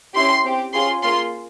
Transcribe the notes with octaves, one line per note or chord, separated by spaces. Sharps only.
C#4 E4 G4 C6
C4 G4
C#4 F4 G#4 C6
A#3 F4 G#4 C6